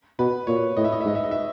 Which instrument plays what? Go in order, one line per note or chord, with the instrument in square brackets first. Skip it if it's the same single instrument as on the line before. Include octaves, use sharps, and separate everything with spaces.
[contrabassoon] B2 [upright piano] B4
[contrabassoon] A#2 [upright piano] C#5
[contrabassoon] A2 [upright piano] D#5
[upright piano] E5
D#5
E5
[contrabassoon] G#2 [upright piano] D#5
[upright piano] E5
D#5
E5